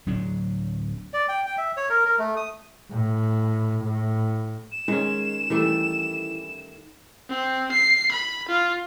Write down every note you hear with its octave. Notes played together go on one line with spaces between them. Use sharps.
D1 F#3 D4
D5
G5
G5
E5
C#5
A#4
A#4
A3
D#6
A2
A2
E7
D#3 G#3 C#4
D#3 E3 G3 A3
C4
C7
B5
F4